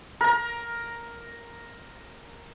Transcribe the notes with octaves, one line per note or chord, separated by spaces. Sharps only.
A#4 A#5